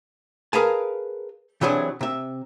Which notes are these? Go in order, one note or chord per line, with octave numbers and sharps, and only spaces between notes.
G#4 A#4 B4 F5 G#5 A5
C3 E3 F#3 D4 G#4
C3 E5